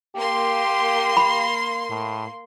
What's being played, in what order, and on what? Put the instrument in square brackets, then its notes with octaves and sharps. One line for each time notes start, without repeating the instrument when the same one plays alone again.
[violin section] A#3 C6 [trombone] G4
[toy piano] B5
[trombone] A2